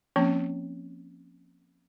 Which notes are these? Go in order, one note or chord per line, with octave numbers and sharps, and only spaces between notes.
F3 A#3 C4 C#4